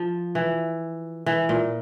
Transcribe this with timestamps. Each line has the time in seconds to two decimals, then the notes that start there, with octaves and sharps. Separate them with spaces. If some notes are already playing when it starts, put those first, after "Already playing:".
Already playing: F3
0.35 E3
1.26 E3
1.49 A#2